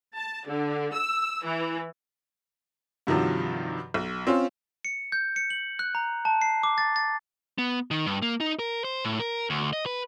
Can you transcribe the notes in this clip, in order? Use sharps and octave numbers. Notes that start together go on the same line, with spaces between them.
A5
D3
E6
E3
G2 C3 D#3 F3 F#3
B1
C4 C#4 F4
C#7
G6
C#7
F#7
F#6
A#5
A5
C7
D6
A6
A6
B3
D#3
G2
A#3
D#4
A#4
C5
A2
A#4
D2
D#5
B4